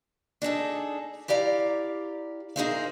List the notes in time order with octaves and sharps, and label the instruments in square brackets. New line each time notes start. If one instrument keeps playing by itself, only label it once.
[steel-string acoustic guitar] D4 D#4 G#4 A4
E4 G4 D5 F5 A#5
D#4 G#4 A#4 C5 E5 F5